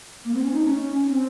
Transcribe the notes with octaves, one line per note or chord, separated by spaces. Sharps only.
A#3
C4
C#4
D#4
C#4
C4